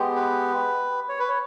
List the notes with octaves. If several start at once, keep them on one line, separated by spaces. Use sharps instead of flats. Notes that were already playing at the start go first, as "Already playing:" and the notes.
Already playing: G#3 B3 G4
B4
C#5
B4
C#5